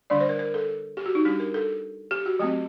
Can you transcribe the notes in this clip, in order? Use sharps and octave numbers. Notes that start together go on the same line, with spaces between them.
D3 G3 D4 D5
C5
A#4
A#4
A4
G4
F#4
D#4
G3 D4 G4
A#4
A4
G4
F#4
F#3 A3 C4 G4